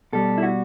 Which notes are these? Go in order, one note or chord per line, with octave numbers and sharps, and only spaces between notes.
B2 G3 A4
E4
F#4